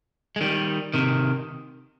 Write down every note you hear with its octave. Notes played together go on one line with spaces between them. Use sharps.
G#3
D#3 G3
C3 D#3